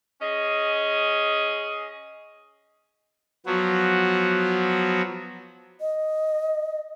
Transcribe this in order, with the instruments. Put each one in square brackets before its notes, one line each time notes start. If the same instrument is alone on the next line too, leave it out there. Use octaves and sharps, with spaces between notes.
[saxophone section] C#4 G#4 D#5
[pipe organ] F3 F#3 B3 F#4
[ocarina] D#5